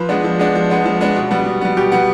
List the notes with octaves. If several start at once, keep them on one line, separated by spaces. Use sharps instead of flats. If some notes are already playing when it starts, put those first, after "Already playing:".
Already playing: F3 B4
G#3 B3 D4
F3
G#3 B3 D4
F3
G#3 B3 D4
F3
G#3 B3 D4
B2
G3 B3
B2
G3 B3
B2 G4
G3 B3